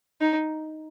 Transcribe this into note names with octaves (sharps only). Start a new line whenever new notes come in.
D#4